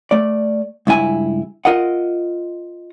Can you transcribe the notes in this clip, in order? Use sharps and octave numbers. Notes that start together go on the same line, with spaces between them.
A3 D5
C#2 G2 E4 G#5
F4 A#4 D#5 F#5